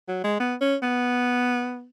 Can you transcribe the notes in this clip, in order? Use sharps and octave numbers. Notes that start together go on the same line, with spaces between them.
F#3
G#3
B3
C#4
B3